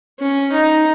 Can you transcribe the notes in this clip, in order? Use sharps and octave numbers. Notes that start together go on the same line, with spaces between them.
C#4
D#4